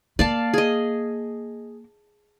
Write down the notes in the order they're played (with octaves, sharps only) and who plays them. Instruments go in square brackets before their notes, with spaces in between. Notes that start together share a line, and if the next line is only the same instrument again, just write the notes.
[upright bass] A#3 [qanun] D5 F5 A5
[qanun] G#4 D#5